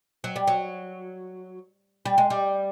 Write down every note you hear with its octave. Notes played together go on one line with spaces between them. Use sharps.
F#3
G3
F#3
G3
G#3
G3